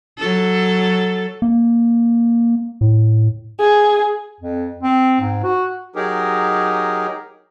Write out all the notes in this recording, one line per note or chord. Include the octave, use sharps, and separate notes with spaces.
F#3 A4
A#3
A2
G#4
F2
C4
G#2
F#4
F#3 D#4 G4 G#4 A#4